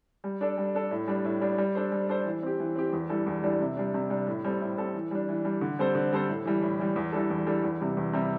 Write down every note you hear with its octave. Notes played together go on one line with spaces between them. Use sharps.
G3
D4 A4 D5
G3
D4 A4 D5
A2
G3 D4
A2
G3 D4
G3
D4 A4 C5
G3
D4 A4 C5
E3
C4 G4
E3
C4 G4
E2
E3 G3 D4 A4
E2
E3 G3 D4 A4
C3
G3 D4
C3
G3 D4
A2
G3 C4 A4
A2
G3 C4 A4
E3
G3 D4
E3
G3 D4
D3
G3 C4 A4 C5
D3
G3 C4 A4 C5
A2
E3 G3
A2
E3 G3
E2
E3 G3 D4 A4
E2
E3 G3 D4 A4
E2
C3 G3
E2
C3 G3